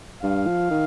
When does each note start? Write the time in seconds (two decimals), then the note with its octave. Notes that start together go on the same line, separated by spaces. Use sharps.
0.23 G2 F5
0.47 F3
0.70 D#3